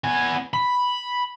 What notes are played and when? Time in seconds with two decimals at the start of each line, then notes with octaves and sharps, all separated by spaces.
0.04 B3 G#5
0.54 B5